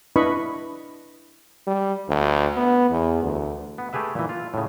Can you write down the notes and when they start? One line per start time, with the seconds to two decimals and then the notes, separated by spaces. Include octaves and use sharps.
0.16 D4 E4 B4 D#5 B5 C#6
1.67 G3
2.09 D2
2.56 B3
2.91 E2
3.22 D2
3.78 B3
3.93 A3 G4 G#4 B4 E5
4.15 A#2 E3
4.29 F4
4.54 A2 C#3